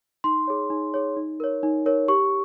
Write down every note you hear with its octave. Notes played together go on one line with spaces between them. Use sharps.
D#4 C6
G#4 C#5
D#4
G#4 C#5
D#4
A#4 C#5
D#4
A#4 C#5
G4 C#6